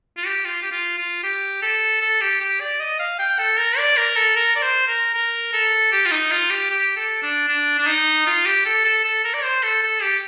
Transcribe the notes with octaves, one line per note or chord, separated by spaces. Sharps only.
F4
G4
F4
G4
F4
F4
G4
A4
A4
G4
G4
D5
D#5
F5
G5
A4
A#4
D5
A#4
A4
A#4
D5
C5
A#4
A#4
A4
G4
F4
D#4
F4
G4
G4
A4
D4
D4
D4
D#4
F4
G4
A4
A4
A4
A#4
D5
C5
A4
A4
G4